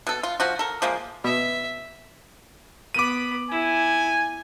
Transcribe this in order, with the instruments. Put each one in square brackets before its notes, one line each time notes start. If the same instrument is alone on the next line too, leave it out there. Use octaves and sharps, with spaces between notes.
[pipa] B2 A4
F4
F3 F#4
A4 A#4
F3 G#3 A#3
[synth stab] B2 [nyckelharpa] E5
[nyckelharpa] B3 B5 [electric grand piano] D6 D#7
[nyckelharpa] E4 [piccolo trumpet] G#5